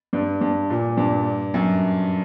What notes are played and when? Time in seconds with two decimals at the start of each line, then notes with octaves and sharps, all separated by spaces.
0.13 G2
0.41 G2
0.70 A#2
0.97 G2
1.54 F#2